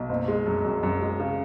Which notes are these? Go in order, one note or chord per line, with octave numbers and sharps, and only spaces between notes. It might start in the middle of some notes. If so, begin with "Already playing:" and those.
Already playing: B1
F#1
G#3
F#2
F#2
F#2
G#3
C#3